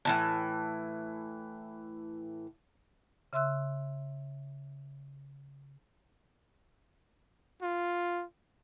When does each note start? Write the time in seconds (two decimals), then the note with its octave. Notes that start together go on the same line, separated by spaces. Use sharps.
0.05 A2 E3 A5
3.33 C#3 E5 C6 E6 F#6
7.62 F4